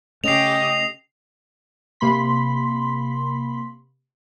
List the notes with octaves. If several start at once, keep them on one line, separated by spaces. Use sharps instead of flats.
C#3 A3 C#4 G4 D#5 C7 F7
C3 A#3 B5 C6 B6